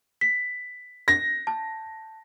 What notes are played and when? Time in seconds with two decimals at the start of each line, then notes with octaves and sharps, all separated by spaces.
0.21 B6
1.08 A#6
1.47 A5